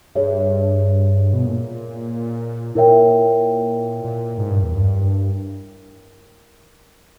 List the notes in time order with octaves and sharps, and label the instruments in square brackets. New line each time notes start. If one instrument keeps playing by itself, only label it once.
[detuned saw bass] G2 [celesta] G#4 C#5 E5
[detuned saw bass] B2
A#2
[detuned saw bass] A#2 [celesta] E4 A#4 C#5 E5 G5
[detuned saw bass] A#2
G#2
G2
E2
G2